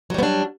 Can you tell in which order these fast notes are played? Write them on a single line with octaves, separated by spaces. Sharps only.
F#3 G3 B3 D4